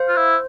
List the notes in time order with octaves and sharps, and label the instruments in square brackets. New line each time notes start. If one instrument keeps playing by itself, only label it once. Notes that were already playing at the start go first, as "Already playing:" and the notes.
Already playing: [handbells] C5 F5
[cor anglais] F4
E4